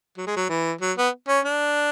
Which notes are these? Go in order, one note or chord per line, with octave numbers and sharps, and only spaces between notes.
F#3
G#3
F#3
E3
F#3
B3
C#4
D4